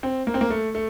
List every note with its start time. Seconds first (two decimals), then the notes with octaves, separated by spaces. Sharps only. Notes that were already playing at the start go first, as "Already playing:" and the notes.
0.03 C4
0.27 A#3
0.34 C4
0.41 A#3
0.50 A3
0.75 A3